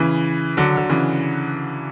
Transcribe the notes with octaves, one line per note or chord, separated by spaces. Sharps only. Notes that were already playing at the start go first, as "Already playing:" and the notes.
Already playing: C#3 E3
D3 F#3
D3
C#3 E3